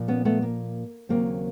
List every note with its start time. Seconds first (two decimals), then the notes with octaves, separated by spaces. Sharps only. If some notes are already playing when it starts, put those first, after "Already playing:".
Already playing: A#2 F3
0.08 B3 C#4
0.25 A3 B3
0.42 A#3
1.09 D#2 C#3 F#3 A#3 C4